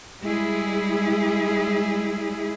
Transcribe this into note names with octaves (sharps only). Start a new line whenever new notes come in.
G3 G#3 E4 G#4